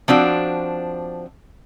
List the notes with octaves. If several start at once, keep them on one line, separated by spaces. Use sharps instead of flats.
F3 C4 D4 F#4